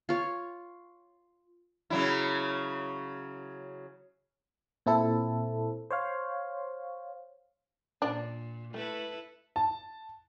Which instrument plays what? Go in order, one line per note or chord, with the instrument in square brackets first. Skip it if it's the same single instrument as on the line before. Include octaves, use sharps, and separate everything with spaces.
[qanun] F4 C#5
[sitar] C#3 F#3 E4
[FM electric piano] A#2 C4 E4 A4
C5 C#5 F5
[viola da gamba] A#2 [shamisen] D4 [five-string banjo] D5
[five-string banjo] A3 [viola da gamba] E4 A4 B4
[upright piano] A5